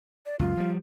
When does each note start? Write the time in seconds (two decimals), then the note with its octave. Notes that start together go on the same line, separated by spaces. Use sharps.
0.26 D5
0.39 C#2 F#2 F4
0.57 F3 G3